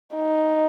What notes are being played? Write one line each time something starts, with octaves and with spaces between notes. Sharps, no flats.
D#4